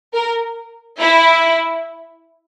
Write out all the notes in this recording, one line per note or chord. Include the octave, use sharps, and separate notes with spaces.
A#4
E4